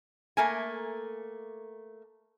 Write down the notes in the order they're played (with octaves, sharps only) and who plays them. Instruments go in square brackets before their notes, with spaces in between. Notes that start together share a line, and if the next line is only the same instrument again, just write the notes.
[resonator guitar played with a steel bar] A3 A#3 G#5